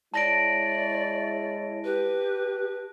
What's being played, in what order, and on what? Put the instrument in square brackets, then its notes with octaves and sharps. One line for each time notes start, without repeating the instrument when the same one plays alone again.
[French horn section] G#3 E4 [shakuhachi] C#5 [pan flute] D5 [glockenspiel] A5 A#6 D7
[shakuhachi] G4 [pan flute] B4